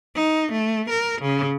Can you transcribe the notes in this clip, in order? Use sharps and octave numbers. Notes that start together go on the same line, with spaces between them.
D#4
A3
A#4
C#3